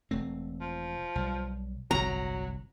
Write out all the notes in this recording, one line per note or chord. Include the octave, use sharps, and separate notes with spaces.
E1 A3 C4
F3
B1 G3
G1 C2 F2 F#3 A#5